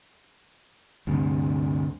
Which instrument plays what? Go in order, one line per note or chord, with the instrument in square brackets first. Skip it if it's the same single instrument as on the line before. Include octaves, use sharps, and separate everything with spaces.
[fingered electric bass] D2 G2 C3